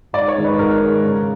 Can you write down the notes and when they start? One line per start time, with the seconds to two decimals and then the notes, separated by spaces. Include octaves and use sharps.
0.13 G#2 D5
0.28 C#5
0.36 D#3 G#3
0.44 B4
0.58 G#2 A#4
0.80 D#3 G#3
1.03 C#3